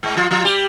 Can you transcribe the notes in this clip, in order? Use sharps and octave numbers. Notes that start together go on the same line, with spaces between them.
G#2 G#3
F3 F4
F3 F4
G3 G4